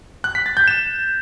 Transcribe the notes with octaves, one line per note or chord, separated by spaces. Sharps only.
F#6
B6
A6
G6
E7